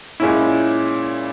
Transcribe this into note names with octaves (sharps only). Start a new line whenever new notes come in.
A#2 G#3 C#4 E4